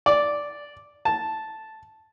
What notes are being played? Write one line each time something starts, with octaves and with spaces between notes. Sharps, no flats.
D5
A5